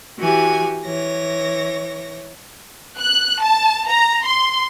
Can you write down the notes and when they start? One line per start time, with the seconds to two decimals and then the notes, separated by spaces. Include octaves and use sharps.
0.18 E3 F#4 G4 G#5 G#6
0.85 E3 C#5 A#6
2.99 F#6
3.42 A5
3.88 A#5
4.27 C6